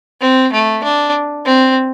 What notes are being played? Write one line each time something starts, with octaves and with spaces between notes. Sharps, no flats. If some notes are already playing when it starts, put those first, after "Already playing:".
C4
A3
D4
C4